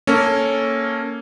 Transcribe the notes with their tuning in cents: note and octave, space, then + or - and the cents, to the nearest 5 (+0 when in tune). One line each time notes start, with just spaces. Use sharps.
A#3 -5 C#4 +0 A4 +0